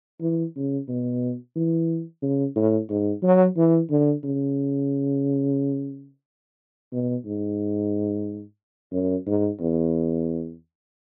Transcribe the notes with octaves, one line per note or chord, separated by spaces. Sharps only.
E3
C#3
B2
E3
C#3
A2
G#2
F#3
E3
D3
C#3
B2
G#2
F#2
G#2
E2